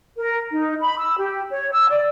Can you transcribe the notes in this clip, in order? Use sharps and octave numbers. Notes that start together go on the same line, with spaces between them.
A#4
D#4
B5
E6
G4
C#5
E6
D5